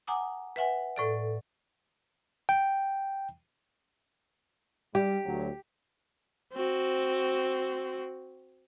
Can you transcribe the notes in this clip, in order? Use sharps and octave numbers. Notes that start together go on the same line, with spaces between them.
F#5 G#5 A#5 D6 D#6
B4 E5 F#5 G#5
A2 A4 D5
G5
G3 G4
D2 F#3
C4 F#4